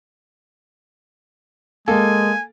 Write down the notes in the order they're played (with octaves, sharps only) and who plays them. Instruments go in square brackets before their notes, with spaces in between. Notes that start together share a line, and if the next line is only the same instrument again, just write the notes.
[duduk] G#3 [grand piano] A#3 A4 [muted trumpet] G#5